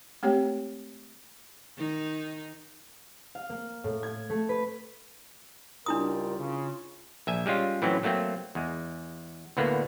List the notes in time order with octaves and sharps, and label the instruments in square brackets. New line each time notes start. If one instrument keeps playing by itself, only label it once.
[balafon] G#3 A3 C4 G4 C#5 G5
[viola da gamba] D#3 D#4
[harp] F5
A#3
A2
G#6
A3
B4
[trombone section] C#2 G3 A#4 [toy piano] D4 E4 D#6 [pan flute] F4
[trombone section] C#3
[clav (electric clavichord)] A#1 E5 G#5
G3 G#3 C#4 F4
A2 E3 F#3 C4 C#4
F#3 A3 A#3 C4
E2 G#3
D2 A2 D3 A#3 B3